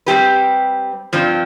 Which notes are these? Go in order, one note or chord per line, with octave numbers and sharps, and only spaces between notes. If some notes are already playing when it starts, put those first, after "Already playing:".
G3 C4 G4 B4
G2 F3 C4